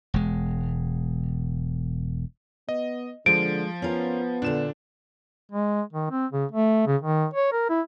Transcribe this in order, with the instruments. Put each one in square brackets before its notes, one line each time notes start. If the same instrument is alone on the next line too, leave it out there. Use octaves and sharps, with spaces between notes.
[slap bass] E1 G#3
[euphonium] B3 [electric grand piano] D#5
[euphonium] D3 [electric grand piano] F3 [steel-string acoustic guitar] G#3 A#3 [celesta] D7
[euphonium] B3 [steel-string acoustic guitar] C#4 F4 A#4
[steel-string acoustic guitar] A#2 D3 [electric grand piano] D4 E7
[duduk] G#3
D#3
C4
C#3
A3
C#3
D#3
C#5
A#4
E4